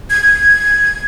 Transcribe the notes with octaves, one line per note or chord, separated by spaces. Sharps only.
G#6